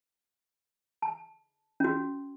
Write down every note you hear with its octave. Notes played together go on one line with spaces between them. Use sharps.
A5
C#4 F#4